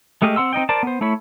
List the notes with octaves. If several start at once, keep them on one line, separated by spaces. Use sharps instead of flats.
G#3 A3 G4 D#5 F5
C4 F#5 C6 E6
C4 D#4 D#5 G5
A#4 C5 D5 A5
B3 C5
A3 E4 C#5 B5